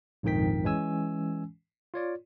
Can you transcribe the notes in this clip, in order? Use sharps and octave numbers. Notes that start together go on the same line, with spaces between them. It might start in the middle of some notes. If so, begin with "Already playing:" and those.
A#1 F2 G#2 D#3 G5 B6
E3 G#3 C#4 G#5 E6
F4 C#5 D5